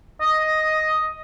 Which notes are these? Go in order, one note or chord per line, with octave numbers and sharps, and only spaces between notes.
D#5